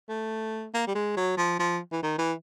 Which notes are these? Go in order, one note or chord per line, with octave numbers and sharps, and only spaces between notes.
A3
A#3
G3
G#3
F#3
F3
F3
E3
D#3
E3